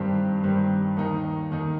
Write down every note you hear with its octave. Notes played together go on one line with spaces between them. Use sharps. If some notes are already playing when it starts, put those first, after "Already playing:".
Already playing: G2 D#3 G3 C4
G2 D#3 G3 C4
D#2 D#3 A#3 D#4
D#2 D#3 A#3 D#4